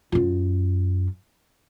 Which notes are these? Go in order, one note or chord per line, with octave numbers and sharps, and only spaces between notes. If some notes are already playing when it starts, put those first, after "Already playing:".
F#2 F4